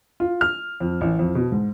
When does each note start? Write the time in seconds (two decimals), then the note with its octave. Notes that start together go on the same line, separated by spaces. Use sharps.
0.20 F4
0.41 F6
0.80 F2
1.01 A1
1.19 F2
1.35 B2
1.52 G#2